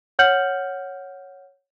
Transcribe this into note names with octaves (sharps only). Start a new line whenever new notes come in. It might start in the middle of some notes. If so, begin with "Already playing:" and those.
C#5 F#5 F6 G6 C#7 F#7